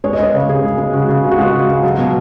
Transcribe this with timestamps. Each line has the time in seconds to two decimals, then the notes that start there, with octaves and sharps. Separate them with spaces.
0.04 G#3 C#5
0.13 D#5
0.19 G#3 C#5
0.34 C#3
0.48 C#3 G#4
0.64 G#3
0.78 G#3
0.93 C#3 F#4
1.09 C#3
1.24 G#3
1.31 F#4
1.38 G#3 F4
1.54 C#3
1.69 C#3
1.83 F#3
1.99 B2